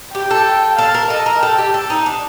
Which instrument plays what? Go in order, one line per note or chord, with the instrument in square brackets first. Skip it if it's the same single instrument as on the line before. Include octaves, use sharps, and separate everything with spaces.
[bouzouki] G4 [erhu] G5
[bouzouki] A4
[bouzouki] A4 [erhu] F5
[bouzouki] A#4
[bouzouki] A4 [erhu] D#5
[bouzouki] A#4
[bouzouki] A4 [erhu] G5
[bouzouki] G4
A4
D#4
D4